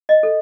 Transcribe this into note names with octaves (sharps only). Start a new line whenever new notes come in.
D#5
A4